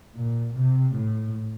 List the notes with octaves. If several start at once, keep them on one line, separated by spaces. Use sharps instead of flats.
A#2
C3
A2